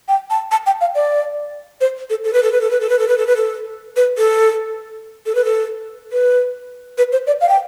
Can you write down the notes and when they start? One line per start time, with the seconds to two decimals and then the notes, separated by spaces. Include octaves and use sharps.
0.08 G5
0.30 A5
0.51 A5
0.66 G5
0.81 F5
0.95 D5
1.81 C5
2.10 A4
2.24 A4
2.33 B4
2.43 A4
2.52 B4
2.61 A4
2.71 B4
2.80 A4
2.89 B4
2.99 A4
3.08 B4
3.18 A4
3.27 B4
3.36 A4
3.96 B4
4.18 A4
5.26 A4
5.35 B4
5.44 A4
6.12 B4
6.98 B4
7.12 C5
7.27 D5
7.41 F5
7.49 G5